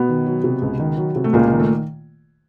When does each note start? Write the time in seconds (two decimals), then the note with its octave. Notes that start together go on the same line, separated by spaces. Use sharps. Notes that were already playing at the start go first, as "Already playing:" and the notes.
Already playing: B2 B3
0.09 D#3
0.26 F#3
0.44 C3
0.62 C#2
0.79 D#3
0.97 F#3
1.16 C3
1.24 A3
1.33 C#2 A#2 A#3
1.52 D#3
1.60 A3